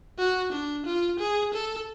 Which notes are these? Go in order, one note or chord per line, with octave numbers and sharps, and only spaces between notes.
F#4
D4
F4
G#4
A4